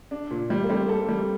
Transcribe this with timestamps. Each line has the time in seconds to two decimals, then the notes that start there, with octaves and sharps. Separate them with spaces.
0.11 D4
0.31 A#2
0.50 G3
0.64 A#3
0.69 G3 A3 C4
0.88 A#3 A4
1.09 G3